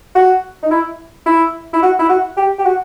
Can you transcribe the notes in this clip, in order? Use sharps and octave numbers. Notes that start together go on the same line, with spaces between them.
F#4
D#4
E4
E4
E4
F#4
E4
F#4
G4
G4
F#4